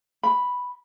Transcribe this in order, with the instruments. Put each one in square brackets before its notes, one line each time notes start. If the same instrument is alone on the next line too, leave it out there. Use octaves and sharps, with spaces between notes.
[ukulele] B5